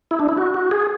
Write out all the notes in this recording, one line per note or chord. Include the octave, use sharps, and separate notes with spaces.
E4
D4
E4
F#4
F#4
G#4